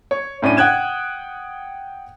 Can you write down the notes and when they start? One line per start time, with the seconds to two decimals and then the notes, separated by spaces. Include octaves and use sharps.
0.11 C#5
0.42 A2 C#4 D4 D#7
0.57 F#5 G5 D#6 F#6 G#6 E7